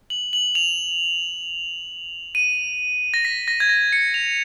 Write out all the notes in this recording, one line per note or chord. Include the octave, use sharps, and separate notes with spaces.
F#7
F#7
F7
D#7
A#6
B6
A#6
G#6
A#6
C#7
F7